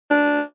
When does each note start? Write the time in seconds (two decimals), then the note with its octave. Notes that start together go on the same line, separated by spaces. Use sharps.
0.10 D4